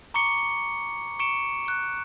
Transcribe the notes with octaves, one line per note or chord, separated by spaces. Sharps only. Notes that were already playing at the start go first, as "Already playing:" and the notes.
A#5 C#6 D6 C#7 G7
C#6 C#7 D7 E7
C#6 F#6